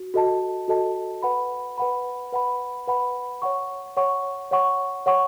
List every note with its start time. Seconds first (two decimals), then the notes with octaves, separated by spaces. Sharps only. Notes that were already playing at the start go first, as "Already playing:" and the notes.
Already playing: F#4
0.14 F#4 A4 D#5 A5
0.68 F#4 A4 D#5 A5
1.23 B4 F#5 B5
1.78 B4 F#5 B5
2.32 B4 F#5 B5
2.87 B4 F#5 B5
3.42 C#5 F#5 C#6
3.97 C#5 F#5 C#6
4.51 C#5 F#5 C#6
5.06 C#5 F#5 C#6